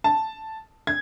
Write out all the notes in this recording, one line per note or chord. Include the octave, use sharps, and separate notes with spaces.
A5
G#6